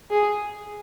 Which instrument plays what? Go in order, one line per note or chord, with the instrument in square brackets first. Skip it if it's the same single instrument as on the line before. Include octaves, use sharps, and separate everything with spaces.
[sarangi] G#4